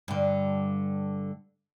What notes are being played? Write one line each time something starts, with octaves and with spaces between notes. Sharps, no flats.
G2 D3